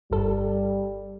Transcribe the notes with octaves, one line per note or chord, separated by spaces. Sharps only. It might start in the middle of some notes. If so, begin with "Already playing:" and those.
G1 G3 A4